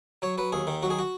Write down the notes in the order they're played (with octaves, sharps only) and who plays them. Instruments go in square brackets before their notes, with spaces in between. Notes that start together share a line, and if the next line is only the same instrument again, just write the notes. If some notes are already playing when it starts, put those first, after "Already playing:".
[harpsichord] F#3 C#5
F#3 B4
D#2 G#4
D#3
F#3 F#4
G#4
F#4